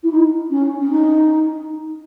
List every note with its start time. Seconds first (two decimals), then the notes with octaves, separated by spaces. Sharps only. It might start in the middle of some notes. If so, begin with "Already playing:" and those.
0.03 E4
0.11 D#4
0.50 C#4
0.79 C#4
0.90 D#4